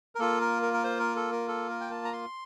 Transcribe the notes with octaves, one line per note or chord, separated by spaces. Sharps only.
A#4
A#3 F4 A4
A#4
A#4
A#4
C5
A#4
A4
A#4
A4
A#4
G5
A5
A#5
C6